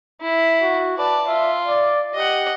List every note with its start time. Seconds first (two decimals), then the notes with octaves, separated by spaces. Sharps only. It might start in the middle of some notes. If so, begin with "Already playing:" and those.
0.21 E4
0.62 F#4
0.98 B4 D5 A5
1.28 F4 E5
1.68 D5
2.15 G4 D#5 F#5